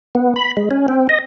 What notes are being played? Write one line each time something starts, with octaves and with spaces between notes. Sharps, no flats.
B3
B5
G#3
C#4
C4
D#5